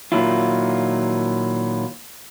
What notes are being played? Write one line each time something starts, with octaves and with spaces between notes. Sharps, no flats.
A#2 D#3 F#3 A#3 E4 F4